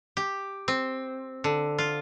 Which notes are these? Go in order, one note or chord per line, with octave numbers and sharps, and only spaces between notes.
G4
C4
D3
F4